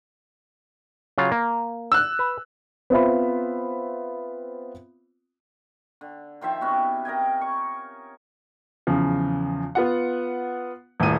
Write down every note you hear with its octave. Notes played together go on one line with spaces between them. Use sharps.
C#3 F#3 F4
A#3
E6 F#6
B4
B3 C4 F4 C5 E5 B5
D3
D#3 F3 C5 E5
C3 B3 C#4 F#4
A#4 D#5 G5 G#5
C#6
E2 C#3 F3
B3 F4 F#5
D#1 A2 D#7